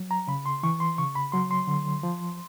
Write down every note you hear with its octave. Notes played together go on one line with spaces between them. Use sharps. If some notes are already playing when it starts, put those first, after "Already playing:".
Already playing: F#3
A#5
C#3 B5
C6
E3 C#6
C6
C#3 C#6
B5
F#3 C6
C6
D3
F3